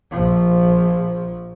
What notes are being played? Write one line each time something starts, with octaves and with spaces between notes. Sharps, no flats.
A#1 F3